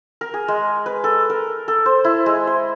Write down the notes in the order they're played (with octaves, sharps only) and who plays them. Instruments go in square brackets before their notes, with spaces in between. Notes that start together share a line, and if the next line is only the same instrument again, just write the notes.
[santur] A#4
G#4
G#3
B4
A4
A#4
A4
C5
E4
G#3
C5